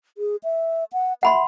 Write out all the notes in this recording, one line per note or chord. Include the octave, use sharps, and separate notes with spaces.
G#4
E5
F#5
E5 F#5 B5 C6